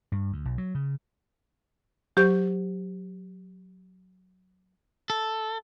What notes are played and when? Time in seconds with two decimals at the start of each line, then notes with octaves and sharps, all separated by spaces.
0.12 G2
0.33 D2
0.45 B1
0.58 F#3
0.75 C#3
2.17 F#3 G4 C5 C#6 G6
5.10 A4